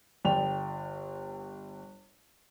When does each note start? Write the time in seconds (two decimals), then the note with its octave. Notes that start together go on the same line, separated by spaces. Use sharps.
0.25 G1 D5 G5 F7